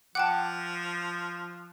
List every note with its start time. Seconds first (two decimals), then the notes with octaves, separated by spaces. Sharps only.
0.15 F3 F#5 G5 A5 D6 F#6